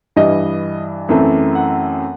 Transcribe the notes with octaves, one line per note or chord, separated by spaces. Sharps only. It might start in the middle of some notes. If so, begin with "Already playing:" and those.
G2 E3 G3 D#5
F#2 E3 A3 C4
F#5